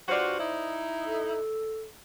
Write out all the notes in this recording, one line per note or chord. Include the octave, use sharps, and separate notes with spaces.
G2 F4 F#4 C5 D5
D#4 E4
A4